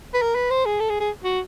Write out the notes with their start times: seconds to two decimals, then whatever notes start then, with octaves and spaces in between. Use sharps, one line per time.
0.14 B4
0.22 A#4
0.36 B4
0.51 C5
0.66 G#4
0.80 A4
0.89 G#4
1.00 G#4
1.24 F#4